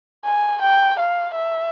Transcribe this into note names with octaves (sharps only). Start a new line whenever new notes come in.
G#5
G5
F5
E5